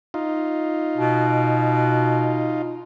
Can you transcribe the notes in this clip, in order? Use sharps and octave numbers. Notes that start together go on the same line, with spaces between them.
D#4 F4
B2